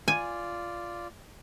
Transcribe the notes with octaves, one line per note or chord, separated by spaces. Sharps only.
F4 D5 G#5